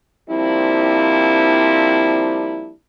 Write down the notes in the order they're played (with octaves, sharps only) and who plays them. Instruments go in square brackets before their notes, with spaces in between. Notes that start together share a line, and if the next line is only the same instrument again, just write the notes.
[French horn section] F3 G3 A#3 C4 D4 E4